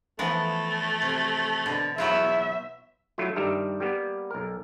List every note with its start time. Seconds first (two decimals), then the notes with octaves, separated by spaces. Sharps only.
0.19 E3 F3 A3 B3
1.02 C3
1.66 B2 D3
1.98 E2 F#3 B3 F4 E5
3.18 F#3 A3 E4 F4
3.36 G2 D#3 G3 E5 A#5
3.80 G3 A#3 B3
4.31 B1 A#4